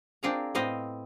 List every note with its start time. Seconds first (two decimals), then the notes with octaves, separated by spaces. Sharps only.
0.23 C4 D4 F4 G#4 A#4 A#5
0.55 A2 B3 C4 D#5 F5